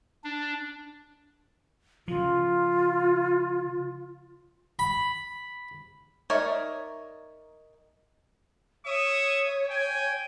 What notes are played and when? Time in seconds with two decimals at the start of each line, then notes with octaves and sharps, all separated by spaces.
0.24 D4
2.08 C#3 F3 F4
4.79 B5
6.30 D#4 A#4 C#5 D5 E5
8.86 C#5 E5 C#6 D#6
9.70 G5 G#5